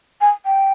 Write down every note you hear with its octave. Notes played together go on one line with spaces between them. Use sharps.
G#5
G5